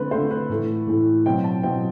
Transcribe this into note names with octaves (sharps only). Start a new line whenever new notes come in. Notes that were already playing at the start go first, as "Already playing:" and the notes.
Already playing: D3 A3 C4 B4
D3 A3 C4 C5
B4
A2 E3 A3
A2 E3 A3
B2 F#3 C4 G5
A5
B2 F#3 C4 G5